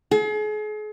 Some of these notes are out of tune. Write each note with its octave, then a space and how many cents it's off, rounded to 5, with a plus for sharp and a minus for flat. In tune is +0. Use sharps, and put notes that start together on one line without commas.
G#4 +40